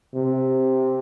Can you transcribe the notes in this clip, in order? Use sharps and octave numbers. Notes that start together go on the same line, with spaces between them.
C3